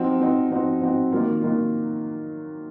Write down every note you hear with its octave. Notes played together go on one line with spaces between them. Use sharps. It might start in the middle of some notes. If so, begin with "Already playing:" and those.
Already playing: F3 C4 D#4 F#4
F3 C4 D#4 F#4
F3 C4 D#4 F#4
F3 C4 D#4 F#4
D#3 F#3 A#3 F4
D#3 F#3 A#3 F4